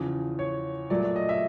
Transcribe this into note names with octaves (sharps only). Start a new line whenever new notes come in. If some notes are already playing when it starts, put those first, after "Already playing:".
Already playing: E2 C#3 F3
C#5
A#2 F#3 A3 D5
D5
D#5
E5